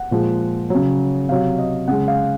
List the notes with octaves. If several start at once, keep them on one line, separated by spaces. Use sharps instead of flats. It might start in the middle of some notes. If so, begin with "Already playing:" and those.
Already playing: F#5
A#2 F3 G#3
C#3 F#3
C3 F#3 F5
D#5
C#3 G#3 F#5
F5